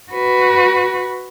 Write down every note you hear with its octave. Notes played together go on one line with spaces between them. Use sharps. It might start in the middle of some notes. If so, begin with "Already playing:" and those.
F#4 B4